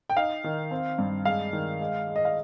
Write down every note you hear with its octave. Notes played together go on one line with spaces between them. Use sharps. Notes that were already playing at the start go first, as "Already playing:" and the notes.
G5
D#4 F5
D#3
C4
G2
G#3 F5
D#3
G#3
G#3
D#5
F5